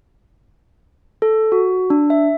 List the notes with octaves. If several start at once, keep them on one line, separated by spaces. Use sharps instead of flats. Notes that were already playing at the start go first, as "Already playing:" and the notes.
A4
F#4
D4
E5